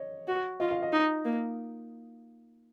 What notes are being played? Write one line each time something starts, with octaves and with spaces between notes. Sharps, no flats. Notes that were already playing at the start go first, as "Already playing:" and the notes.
Already playing: C#5 D#5
F#4
F4 D#5
F5
D#5
D#4
A#3